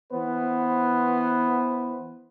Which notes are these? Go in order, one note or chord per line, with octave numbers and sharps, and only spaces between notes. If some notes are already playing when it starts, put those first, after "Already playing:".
E3 B3 B4 C5